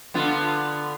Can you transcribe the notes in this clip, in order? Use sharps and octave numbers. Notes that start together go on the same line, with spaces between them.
D3 B3 F4